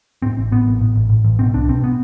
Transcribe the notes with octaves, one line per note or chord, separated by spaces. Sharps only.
A2 C4
A1
A2 B3
A1
A2
A1
A2
A1
B2 C4
C2 D4
B2 C4
B3